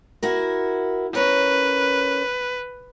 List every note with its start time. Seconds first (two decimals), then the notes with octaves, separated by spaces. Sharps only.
0.23 E4 F#4 A#4
1.15 C#4 A#4 B4 C#5